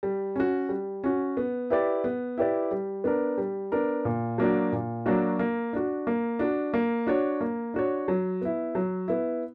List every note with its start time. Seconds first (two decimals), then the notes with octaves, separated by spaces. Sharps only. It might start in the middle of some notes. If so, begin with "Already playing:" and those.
0.03 G3
0.36 C#4 F#4
0.69 G3
1.04 C#4 F#4
1.37 B3
1.70 E4 G4 B4 D5
2.04 B3
2.38 E4 G4 B4 D5
2.71 G3
3.04 B3 D4 A#4
3.38 G3
3.72 B3 D4 A#4
4.05 A#2
4.38 F#3 A#3 D4 F#4
4.72 A#2
5.06 F#3 A#3 D4 F#4
5.39 A#3
5.73 D4 F#4
6.07 A#3
6.39 D4 F#4
6.74 A#3
7.07 D4 F#4 C#5
7.41 A#3
7.74 D4 F#4 C#5
8.08 F#3
8.41 B3 E4
8.75 F#3
9.08 B3 E4